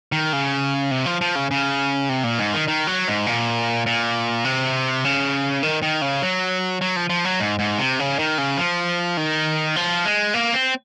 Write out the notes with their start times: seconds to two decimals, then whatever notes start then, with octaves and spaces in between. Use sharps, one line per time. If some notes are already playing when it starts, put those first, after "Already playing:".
0.12 D#3
0.33 C#3
0.91 C3
1.06 F3
1.21 F3
1.35 C#3
1.51 C#3
2.09 C3
2.24 A#2
2.39 G#2
2.54 D#3
2.68 D#3
2.87 F#3
3.08 G#2
3.26 A#2
3.86 A#2
4.45 C3
5.05 C#3
5.63 D#3
5.82 D#3
6.02 C#3
6.22 F#3
6.81 F#3
6.96 F3
7.10 F3
7.25 F#3
7.40 G#2
7.59 G#2
7.79 C3
7.99 C#3
8.19 D#3
8.38 C#3
8.58 F3
9.17 D#3
9.76 F3
10.05 G#3
10.34 A#3
10.54 C4